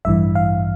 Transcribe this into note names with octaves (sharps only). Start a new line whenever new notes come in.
A1 G2 E3 E5
F5